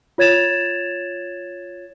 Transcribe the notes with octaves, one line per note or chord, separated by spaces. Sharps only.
F4 C#5 G#6 A6 E7 F7